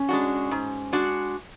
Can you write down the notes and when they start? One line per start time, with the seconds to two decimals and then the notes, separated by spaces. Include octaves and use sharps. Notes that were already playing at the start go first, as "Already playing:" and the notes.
Already playing: C#4
0.09 G#3 D4 F#4
0.51 G#2
0.93 G#3 D4 F#4